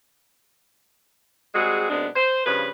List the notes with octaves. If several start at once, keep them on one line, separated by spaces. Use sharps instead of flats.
G3 G#3 C4 F#4 G#4
F#2 C3 G#3 B3 D4
C5
G2 C#3 F3 B4